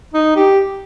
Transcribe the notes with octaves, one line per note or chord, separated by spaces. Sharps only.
D#4
G4